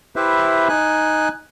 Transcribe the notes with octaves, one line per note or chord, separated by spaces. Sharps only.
E4 G4 B4 C5 E5
D#4 G#5 F#6